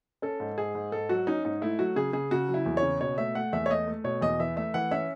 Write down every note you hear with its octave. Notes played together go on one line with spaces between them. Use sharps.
C#4 A4
G#2
G#2 G#4
G#2
G#2 A4
F#3 F#4
C#4 D#4
G#2 D#4
A3 E4
F#3 F#4
C#3 G#4
C#3 G#4
C#3 F#4
F#3
E4
E2
C#5
C#3
B2 C#5
A3 E5
A3 F#5
E2 E5
C#5
A3 D#5
A3
B2 C#5
E2 D#5
E3 E5
A3 E5
E3 F#5
C#4 E5